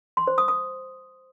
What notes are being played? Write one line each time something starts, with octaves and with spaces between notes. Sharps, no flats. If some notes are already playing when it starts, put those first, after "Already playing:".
C6
C5
D#6
D#6